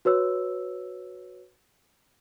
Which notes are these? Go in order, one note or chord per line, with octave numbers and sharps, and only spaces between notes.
F#4 B4 C#5 E6